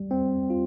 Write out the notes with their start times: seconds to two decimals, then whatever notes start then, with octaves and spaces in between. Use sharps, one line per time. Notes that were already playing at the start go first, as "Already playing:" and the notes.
Already playing: G3
0.11 C4
0.50 F4